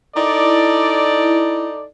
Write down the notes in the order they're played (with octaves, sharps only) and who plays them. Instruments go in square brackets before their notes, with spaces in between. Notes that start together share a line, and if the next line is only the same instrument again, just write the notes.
[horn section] D#4 A4 D5 [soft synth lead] E4